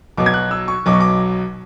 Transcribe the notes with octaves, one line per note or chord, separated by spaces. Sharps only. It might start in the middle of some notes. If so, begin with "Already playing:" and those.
B1 B2 F#3 D6
G#6
F#6
E6
C#6
B1 B2 F#3 D6
C#6
D6